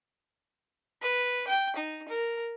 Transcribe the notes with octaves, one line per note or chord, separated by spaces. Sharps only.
B4
G5
D#4
A#4